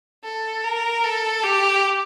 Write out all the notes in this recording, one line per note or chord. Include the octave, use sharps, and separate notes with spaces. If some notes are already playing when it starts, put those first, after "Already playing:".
A4
A#4
A4
G4